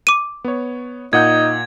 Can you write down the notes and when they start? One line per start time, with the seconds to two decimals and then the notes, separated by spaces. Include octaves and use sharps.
0.07 D6 D#7
0.44 B3 C#5
1.13 A#2 D#4 F#5 G6 G#6